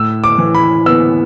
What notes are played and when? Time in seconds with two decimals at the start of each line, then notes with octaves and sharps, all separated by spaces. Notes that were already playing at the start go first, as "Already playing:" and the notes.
Already playing: A2 E6
0.24 D6
0.38 E3
0.55 B5
0.86 B3 E6